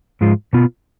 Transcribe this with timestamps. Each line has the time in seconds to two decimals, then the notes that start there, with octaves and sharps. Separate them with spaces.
0.21 G#2 F3 G#3 F4
0.53 B2 B3 F4